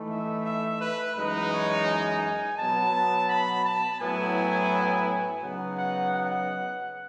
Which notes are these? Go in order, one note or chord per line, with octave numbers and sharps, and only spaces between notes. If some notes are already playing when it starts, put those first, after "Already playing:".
Already playing: E3 A3 D#4
E5
E5
B4
F#2 E3 G#3 D#4 B4
C#5
G#5
B2 F#3 B3 A5
B5
A5
A2 F#3 B3 E4 G#5
C#3 F#3 B3 D#4 F#5
F#5
F#5